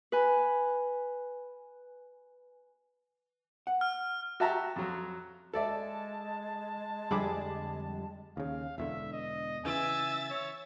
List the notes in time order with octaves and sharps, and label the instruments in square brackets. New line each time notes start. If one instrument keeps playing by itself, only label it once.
[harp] B4 G#5
[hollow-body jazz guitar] F#5
[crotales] F6
[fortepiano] F#4 G4 E5 A5 A#5
F2 F#3
[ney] G#3 [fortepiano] A4 D5 E5 [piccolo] A5
[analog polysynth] F2 D3 G3 [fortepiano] G#4 B5 D6
[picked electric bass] D#2 C#3 [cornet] F5
[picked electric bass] E1 E2 D3 [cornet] E5
[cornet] D#5
[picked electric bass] C#3 E3 [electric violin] E5 A6 [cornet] G#5
[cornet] C#5